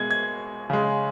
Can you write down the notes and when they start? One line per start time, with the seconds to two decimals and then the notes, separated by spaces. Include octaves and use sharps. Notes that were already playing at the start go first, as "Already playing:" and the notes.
Already playing: B2 G#3 G#6
0.11 G#6
0.70 C#3 G#3